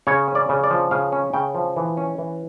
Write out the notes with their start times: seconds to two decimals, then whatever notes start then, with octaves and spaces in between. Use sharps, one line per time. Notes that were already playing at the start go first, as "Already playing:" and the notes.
0.07 C#3 C#5
0.28 C#4
0.35 D5
0.49 C#3
0.64 D5
0.70 F3
0.91 C#3 F5
1.12 C#4
1.34 C#3 G5
1.55 F3
1.77 E3
1.97 C#4
2.18 E3